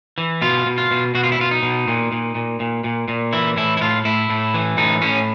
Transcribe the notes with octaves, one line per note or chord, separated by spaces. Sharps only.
E3
B2 F4
B2
F4
B2
B2 F#4
F4
E4
B2 F4
D#4
B2
A#2
A#2
A#2
A#2
A#2
A#2
E3 E4
A2 E4
E4
A2 F4
A2 E4
A2
E3
A2 D#4
A2 C#4